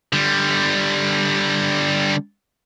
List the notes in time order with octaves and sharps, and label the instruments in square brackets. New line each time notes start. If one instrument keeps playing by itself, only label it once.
[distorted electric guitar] D3 G3